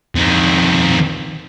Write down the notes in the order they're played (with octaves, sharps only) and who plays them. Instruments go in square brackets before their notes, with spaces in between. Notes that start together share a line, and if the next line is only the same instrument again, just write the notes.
[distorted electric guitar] F2 D#3